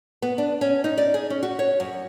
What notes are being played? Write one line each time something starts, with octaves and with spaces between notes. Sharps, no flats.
B3
D4
C#4
D#4
D5
G#4
C#4
F#4
C#5
F#2